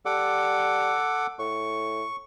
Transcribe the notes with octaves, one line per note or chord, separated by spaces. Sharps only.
G3 A4 F#5 D6
A2 C#6